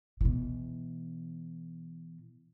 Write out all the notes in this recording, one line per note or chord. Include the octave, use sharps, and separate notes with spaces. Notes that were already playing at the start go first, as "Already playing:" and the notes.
B2 E3